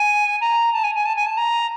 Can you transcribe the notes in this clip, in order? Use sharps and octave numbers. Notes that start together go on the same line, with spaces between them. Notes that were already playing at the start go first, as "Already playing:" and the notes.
Already playing: G#5
A#5
A5
G#5
G#5
A5
G#5
A5
A#5